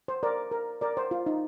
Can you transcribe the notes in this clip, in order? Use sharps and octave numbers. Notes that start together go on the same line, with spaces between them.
C5
A#4 D5
A#4
A#4 D5
C5
F4
D#4